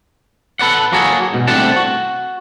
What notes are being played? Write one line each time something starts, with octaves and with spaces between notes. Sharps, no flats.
A4 B4 D5 F#5
F#3 A#3 F#4 G#4 A4
G#2 B2
C2 A3 C4 D4 F#5 A5
F#4